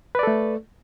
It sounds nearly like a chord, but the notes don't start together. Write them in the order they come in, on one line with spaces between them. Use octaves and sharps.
B4 D5 A4 A3